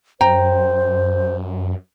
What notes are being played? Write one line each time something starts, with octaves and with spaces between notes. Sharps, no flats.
F#2 C5 G5 A#5